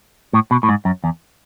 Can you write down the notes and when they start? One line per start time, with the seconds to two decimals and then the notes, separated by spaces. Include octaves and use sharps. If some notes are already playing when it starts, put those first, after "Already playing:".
0.33 A2
0.51 B2
0.63 A2
0.69 G#2
0.85 F#2
1.04 E2